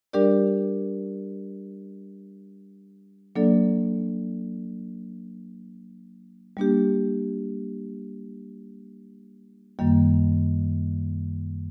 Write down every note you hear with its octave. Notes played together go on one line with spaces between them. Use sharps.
G3 D4 G4 A#4 D5
F#3 A#3 D4 A4 D5
G3 A#3 D4 G4
F#2 D#3 G3 A#3